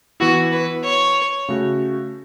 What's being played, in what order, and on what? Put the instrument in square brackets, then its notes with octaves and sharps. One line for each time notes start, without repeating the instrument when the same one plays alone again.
[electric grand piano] E3 B3 E4 [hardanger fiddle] F#4
[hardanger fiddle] B4
C#5
[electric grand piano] C#3 A3 F#4